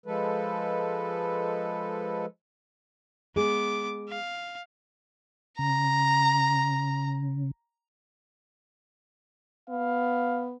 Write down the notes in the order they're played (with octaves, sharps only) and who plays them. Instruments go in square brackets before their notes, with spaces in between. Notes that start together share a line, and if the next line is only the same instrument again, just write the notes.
[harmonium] F3 G#3 A4 B4
[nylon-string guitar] G#3 G#4 [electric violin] B3 D6
[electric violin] F5
[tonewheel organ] C#3 [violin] A#5
[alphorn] B3 [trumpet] F5